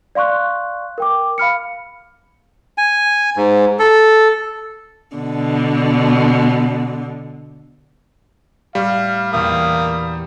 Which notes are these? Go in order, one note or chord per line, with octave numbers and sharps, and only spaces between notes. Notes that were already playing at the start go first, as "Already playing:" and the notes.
D5 F5 C6 C#6 F#6
A#4 G5 D6
F5 B5 F6 C#7
G#5
G#2
A4
B2 D3
A2 G3 F5 C#6 C7
E2 A#2 A#3 F5 D#6